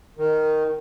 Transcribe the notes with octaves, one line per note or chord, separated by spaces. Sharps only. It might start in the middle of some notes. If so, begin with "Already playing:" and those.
D#3